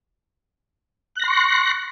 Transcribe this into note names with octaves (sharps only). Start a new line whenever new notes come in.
C6 C#6 F#6 A#6